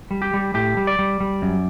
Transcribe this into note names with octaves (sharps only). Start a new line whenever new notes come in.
G3
G4
G3
A2 G4
G3
D5
G3
G3
F#2